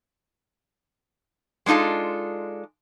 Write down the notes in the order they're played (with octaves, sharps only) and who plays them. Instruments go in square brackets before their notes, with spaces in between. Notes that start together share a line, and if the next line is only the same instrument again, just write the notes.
[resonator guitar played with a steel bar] G#3 D4 D#4 F4 A4